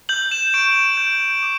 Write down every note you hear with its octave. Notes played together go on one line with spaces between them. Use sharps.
G6 F#7
E7
C#6 D7
G6
D6